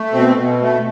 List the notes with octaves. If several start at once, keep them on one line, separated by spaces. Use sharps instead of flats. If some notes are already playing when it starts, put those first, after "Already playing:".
Already playing: A3
B2 C4
B2
A3